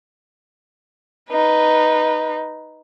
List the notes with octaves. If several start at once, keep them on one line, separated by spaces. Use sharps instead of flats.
D#4 B4